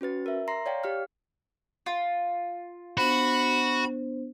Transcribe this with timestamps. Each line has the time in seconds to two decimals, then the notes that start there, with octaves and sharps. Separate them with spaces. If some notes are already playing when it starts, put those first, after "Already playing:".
0.01 C#4 F#4 B4 A6
0.26 A#4 E5
0.48 A#5 C6 A#6 C7
0.66 C#5 D5 F5 G5
0.84 G4 F5 F6
1.86 F4
2.97 B3 D4 F#4 C5 B5